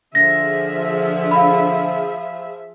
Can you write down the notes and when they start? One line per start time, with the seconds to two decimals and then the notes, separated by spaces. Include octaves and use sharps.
0.15 D3 F3 G#4 E5 A#6
1.31 F5 B5